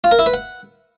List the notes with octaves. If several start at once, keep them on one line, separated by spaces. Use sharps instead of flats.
F4
A#4
E4
B4
F#5